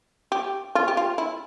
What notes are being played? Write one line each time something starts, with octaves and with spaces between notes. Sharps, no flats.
G4
F4
G4
F4
E4